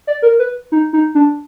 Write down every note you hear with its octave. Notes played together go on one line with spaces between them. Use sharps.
D5
A#4
B4
D#4
D#4
D4